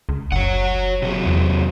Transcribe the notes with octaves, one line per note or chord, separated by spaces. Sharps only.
C#2
F#1 C#5 F#5
C3 F#3 G#4
E2